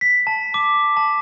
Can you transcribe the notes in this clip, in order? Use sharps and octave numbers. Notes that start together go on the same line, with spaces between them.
B6
A5
D6
A5